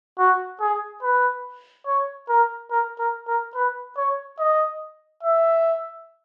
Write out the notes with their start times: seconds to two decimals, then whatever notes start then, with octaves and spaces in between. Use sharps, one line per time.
0.19 F#4
0.61 G#4
1.03 B4
1.87 C#5
2.29 A#4
2.71 A#4
2.99 A#4
3.28 A#4
3.55 B4
3.97 C#5
4.39 D#5
5.23 E5